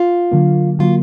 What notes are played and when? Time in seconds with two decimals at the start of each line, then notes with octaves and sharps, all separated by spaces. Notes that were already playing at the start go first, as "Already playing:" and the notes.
Already playing: F4
0.32 D3 F#3 A#3
0.79 D3 F#3 A#3 F4